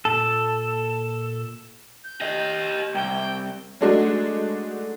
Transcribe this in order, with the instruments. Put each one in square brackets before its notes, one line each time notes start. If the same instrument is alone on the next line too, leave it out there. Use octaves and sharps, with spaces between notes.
[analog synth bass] A#2 [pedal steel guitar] A4
[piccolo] G6
[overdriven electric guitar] G4 D#5
[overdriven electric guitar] C2 [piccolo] G5
[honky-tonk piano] F#3 G#3 A3 D4 D#4 F#4